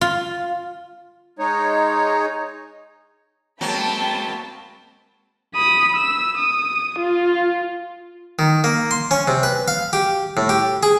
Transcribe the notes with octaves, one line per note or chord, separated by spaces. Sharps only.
F4
G#3 D#4 C#5
F#3 G#3 A#3 C4 G5 A5 B5
B5 D#6
E6
D#6
F4
D#3
A#3
C6
C#4
C3
B4
F5
G4
A2
G4
G#4